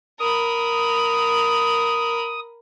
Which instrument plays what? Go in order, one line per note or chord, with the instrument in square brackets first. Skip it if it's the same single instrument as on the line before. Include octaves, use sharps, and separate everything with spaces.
[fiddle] A#4 B5 [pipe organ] D#6